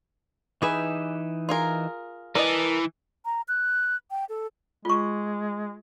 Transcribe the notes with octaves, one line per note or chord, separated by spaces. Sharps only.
E3 D#4 G4 G#4 B4 E5
F4 G#4 A#4
E3 A#4 D5 D#5 A5
A#5
F#6
G5
A4
G#3 F4 C#6